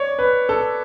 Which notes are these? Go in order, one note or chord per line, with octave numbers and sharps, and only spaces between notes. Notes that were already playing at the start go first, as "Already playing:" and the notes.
Already playing: C#5 D5
B4
A4